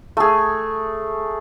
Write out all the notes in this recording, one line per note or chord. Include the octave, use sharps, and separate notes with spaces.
A3 G#4